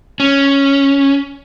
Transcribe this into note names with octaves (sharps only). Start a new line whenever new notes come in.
C#4